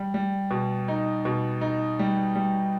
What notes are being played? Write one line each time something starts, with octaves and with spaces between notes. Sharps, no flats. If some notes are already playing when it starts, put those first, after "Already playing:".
Already playing: G3
G3
B2
D#4
B2
D#4
G3
G3